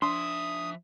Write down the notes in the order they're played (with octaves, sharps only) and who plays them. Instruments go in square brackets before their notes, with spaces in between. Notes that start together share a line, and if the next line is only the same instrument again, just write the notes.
[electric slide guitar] F3 E5 [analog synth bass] D4 [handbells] C6 [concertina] D#6